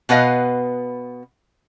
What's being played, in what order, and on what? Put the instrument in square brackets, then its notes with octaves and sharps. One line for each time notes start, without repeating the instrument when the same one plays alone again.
[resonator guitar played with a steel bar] B2 B3 B4 D#5 F5